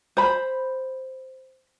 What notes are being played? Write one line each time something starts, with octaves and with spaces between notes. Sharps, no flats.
C5 B5